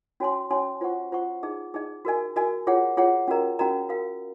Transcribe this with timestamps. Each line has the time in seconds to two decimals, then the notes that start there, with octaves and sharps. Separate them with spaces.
0.20 C#4 F#4 C#5 G#5 C6
0.50 C#4 F#4 C#5 G#5 C6
0.81 F4 C5 F#5 C#6
1.12 F4 C5 F#5 C#6
1.43 D#4 G#4 D#5
1.74 D#4 G#4 D#5
2.05 F#4 A#4 D#5 G#5
2.36 F#4 A#4 D#5 G#5
2.67 F4 G#4 C#5 F#5
2.97 F4 G#4 C#5 F#5
3.28 C#4 F#4 A#4 D#5 A#5
3.59 C#4 F#4 A#4 D#5 A#5
3.89 F#4 A#4 F5